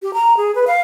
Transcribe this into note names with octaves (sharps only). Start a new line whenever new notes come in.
G4
A#5
G#4
B4
F5